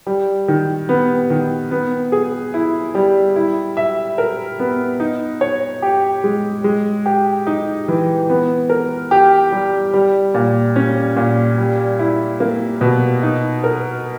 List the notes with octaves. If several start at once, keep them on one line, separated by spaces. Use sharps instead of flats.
G3
D#3
B3
D#3
B3
G#4
E4
G3
E4
E5
A#4
B3
D#4
C#5
G4
G#3
G#3
G4
D#4
E3
B3
A#4
G4
G3
G3
A#2
C#4
A#2
G3
E4
A#3
B2
D#4
A#4